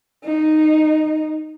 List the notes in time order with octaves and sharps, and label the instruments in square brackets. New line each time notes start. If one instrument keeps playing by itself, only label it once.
[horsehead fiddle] D#4